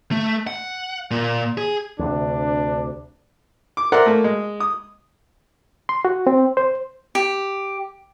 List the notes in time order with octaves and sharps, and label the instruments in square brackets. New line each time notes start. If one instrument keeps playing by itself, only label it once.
[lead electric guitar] A3
F#5
A#2
G#4
[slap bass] D2 C3 [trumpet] D4
[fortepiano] D6
A#4 C5 D5 E5 F#5
A3 A#3
G#3
D#6
[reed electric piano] C6
F#4
C4
C5
[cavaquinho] G4